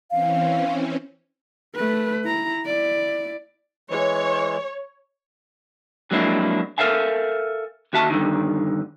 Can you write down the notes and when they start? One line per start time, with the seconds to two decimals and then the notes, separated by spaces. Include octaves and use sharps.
0.11 E3 C4 C#4 F5
1.76 A3 B4
2.24 E4 A#5
2.64 E4 D5
3.90 E3 G#3 C#5
6.11 F2 F#3 G#3 A#3 D4 E4
6.78 A4 A#4 D5 E5 F5 G#5
7.93 D#2 F#4 E5 A5
8.10 G2 D3 D#3